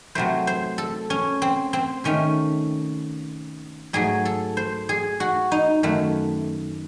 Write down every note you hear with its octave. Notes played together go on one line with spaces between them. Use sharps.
C3 F#3 A3 C5
C5
A4
C#4
C4
C4
C3 D#3 A3 C#4
G#2 F#3 A3 G#4
A4
C5
G#4
F#4
D#4
F#2 D#3 A3